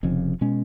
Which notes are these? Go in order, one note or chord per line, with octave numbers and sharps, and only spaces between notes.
F1 F2 C#3
B2 G#3 C#4